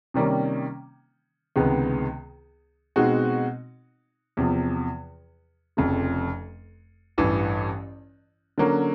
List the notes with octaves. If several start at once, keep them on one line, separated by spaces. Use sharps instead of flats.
C3 D#3 G3 A#3 C#4
C#2 C3 D#3 G#3 B3
B2 G#3 C4 D#4 F#4
E2 C3 F3
F1 F2 C#3
A1 G2 E3
D3 F#3 A#3 C#4